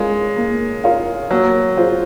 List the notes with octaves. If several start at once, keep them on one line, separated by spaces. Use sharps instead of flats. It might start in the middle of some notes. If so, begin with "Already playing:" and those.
Already playing: G#3 F4 A#4 C#5 F5
A#3
F4 A#4 C#5 F5
F#3 A#3
F4 G#4 C5